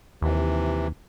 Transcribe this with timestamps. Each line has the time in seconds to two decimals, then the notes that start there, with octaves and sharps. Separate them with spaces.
0.22 D#2 C3 E3